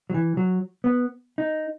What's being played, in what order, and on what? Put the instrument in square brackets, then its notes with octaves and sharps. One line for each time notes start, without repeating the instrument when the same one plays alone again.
[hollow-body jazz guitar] F#3
E3
F#3
B3
D#4